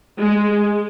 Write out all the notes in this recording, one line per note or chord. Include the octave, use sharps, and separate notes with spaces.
G#3